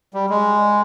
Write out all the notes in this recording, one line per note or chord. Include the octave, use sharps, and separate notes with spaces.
G3
G#3